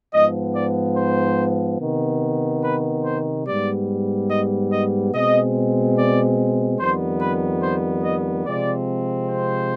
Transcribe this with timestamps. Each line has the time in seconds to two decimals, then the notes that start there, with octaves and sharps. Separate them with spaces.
0.13 G#2 F3 B3 D#5
0.55 D5
0.96 C5
1.80 C3 D#3 B3
2.63 B4
3.05 C5
3.46 G#2 G3 B3 D5
4.29 D#5
4.71 D#5
5.13 B2 G#3 C4 D#5
5.97 D5
6.79 F2 D#3 G3 B3 C5
7.21 B4
7.63 C5
8.04 D#5
8.46 C3 F3 G#3 C4 D5
9.29 C5